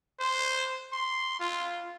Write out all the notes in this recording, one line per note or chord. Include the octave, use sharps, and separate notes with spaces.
C5
C6
F4